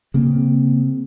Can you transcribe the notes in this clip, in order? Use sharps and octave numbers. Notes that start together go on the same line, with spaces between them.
C#3 A#3 C4